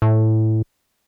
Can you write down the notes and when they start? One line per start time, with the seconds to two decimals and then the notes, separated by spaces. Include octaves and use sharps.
0.02 A2